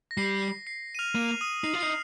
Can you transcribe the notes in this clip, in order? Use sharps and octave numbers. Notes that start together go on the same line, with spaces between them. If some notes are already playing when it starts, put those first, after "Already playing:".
A#6
G3 C7
C7
D#7
F6 F7
A#3 D#7
F7
D#6 D#7
D#4 C7
F4
D#4 C7